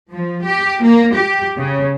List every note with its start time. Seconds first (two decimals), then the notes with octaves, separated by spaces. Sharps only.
0.13 F3
0.45 G4
0.83 A#3
1.15 G4
1.58 C#3